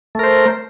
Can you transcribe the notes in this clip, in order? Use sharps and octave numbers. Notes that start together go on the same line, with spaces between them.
A3 A#4 C5